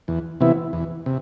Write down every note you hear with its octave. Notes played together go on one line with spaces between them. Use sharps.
E2
C3 E3 B3 E4
E2
C3